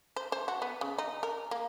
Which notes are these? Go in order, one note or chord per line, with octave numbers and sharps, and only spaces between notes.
C5
C5
F#4
B3
C#3
D#4
A#4
A#3